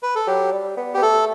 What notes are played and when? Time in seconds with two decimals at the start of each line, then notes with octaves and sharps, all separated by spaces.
0.03 B4
0.16 A4
0.27 F#3 G4
0.52 G3
0.77 B3
0.94 B3 G4
1.02 A3 A4